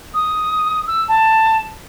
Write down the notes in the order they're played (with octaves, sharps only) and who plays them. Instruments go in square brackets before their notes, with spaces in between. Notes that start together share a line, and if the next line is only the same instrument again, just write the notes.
[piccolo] D#6
E6
A5